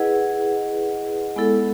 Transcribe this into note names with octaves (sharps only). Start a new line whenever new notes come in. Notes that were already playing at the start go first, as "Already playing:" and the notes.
Already playing: E4 G#4 B4 D#5 F#5
G#3 B3 E4 A4